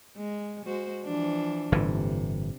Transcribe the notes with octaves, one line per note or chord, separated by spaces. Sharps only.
G#3
G#3 F#4 C5
E3 F3 D4
G1 A2 C3 E3